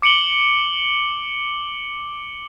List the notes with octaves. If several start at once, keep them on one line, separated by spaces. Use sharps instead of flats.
D6 C#7 D7 F#7 G7